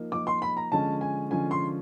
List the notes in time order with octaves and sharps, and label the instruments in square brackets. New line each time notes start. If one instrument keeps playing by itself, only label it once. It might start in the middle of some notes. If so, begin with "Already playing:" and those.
Already playing: [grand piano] F3 A#3 D#4
[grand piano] F3 A#3 D#4 [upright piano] D6
[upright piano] C6
B5
A#5
[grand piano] D3 F3 G#3 C#4 [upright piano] A5
[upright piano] G#5
[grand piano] D3 F3 G#3 C#4 [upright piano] G#5
[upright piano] C6